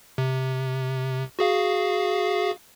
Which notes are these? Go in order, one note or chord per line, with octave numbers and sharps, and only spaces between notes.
C3
F#4 G#4 F5